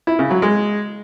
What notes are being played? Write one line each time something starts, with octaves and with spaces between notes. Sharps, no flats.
E4
C#3
F#3
G#3